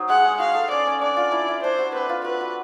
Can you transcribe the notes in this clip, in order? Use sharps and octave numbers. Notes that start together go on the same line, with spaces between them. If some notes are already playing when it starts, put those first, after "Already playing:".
Already playing: F#3 D#4 C5
G#3 F#5
G#3
F#4 F5
A4
C#4 D5
C#4
D4 D5
F4
E4
E4
D4 C5
F#4
C4 B4
F4
F#4 B4
F#4